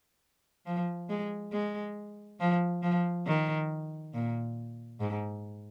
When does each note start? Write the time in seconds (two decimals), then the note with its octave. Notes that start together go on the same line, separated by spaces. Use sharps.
0.66 F3
1.09 G#3
1.52 G#3
2.40 F3
2.83 F3
3.26 D#3
4.14 A#2
5.00 G#2